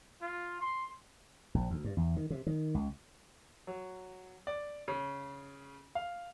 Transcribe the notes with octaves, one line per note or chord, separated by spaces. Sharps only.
F4
C6
A#1
D2
G2
E2
D#3
C3
D#3
C#2
F#3
D5
C#3
F5